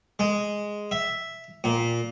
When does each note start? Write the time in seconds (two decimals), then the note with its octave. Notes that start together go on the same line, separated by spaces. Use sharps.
0.19 G#3
0.91 E5
1.64 A#2